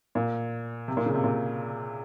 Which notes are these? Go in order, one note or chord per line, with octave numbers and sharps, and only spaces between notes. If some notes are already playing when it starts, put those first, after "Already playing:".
A#2
C3
A#2
C#3
C3
A#2